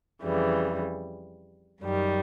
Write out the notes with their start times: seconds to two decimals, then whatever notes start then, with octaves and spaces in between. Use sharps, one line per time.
0.22 F2 C#3 E3 G3
1.82 F#2 D#3 G3